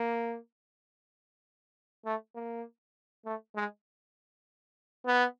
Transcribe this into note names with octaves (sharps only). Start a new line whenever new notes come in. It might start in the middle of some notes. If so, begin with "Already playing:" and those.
Already playing: A#3
A3
A#3
A3
G#3
B3